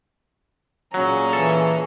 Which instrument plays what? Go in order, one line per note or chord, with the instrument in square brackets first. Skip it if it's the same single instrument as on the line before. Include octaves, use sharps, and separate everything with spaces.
[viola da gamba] A#2 C#4 [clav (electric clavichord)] F#3 [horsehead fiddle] G#4 A#5
[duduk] E3 [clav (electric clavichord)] A4